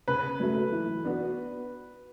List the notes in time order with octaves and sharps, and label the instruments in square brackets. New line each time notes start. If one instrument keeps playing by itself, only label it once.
[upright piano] C#3 [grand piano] B4
[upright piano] F#3 A3
E3
B3 D4 F#4